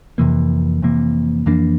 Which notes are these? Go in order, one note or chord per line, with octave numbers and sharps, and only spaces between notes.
F2 C3 E3 A#3
F2 C3 E3 A#3
F2 E3 A#3 D4